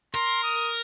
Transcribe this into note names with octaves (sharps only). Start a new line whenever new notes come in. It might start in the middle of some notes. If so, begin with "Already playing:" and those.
A#4 C6
D#6